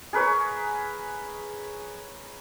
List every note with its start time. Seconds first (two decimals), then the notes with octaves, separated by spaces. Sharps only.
0.13 G#4 A#4 B4 C#5